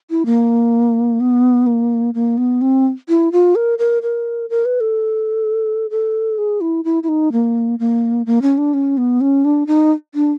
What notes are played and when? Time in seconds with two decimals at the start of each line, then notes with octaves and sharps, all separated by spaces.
0.10 E4
0.26 A#3
1.20 B3
1.66 A#3
2.14 A#3
2.38 B3
2.61 C4
3.09 E4
3.32 F4
3.55 A#4
3.79 A#4
4.02 A#4
4.50 A#4
4.65 B4
4.80 A4
5.91 A4
6.38 G#4
6.61 E4
6.85 E4
7.03 E4
7.09 D#4
7.32 A#3
7.79 A#3
8.26 A#3
8.42 C#4
8.58 D4
8.74 C#4
8.97 B3
9.21 C#4
9.45 D4
9.67 D#4
10.15 D4